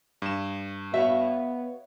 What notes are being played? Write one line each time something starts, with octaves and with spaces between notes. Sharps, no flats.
G2 E7
B3 F#4 C#5 E5 F5